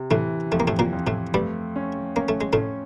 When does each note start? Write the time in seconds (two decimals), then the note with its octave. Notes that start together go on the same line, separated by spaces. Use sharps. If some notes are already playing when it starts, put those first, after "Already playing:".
Already playing: C3
0.11 A2 E3 A3
0.52 F2 A3
0.60 A#3
0.67 A2 A3
0.79 A#2 A#3
0.93 F2
1.07 A2 A3
1.34 G2 G3 A3
1.76 C#4
2.16 A#3 C#4
2.29 A3
2.41 G#3
2.53 A2 A3 C#4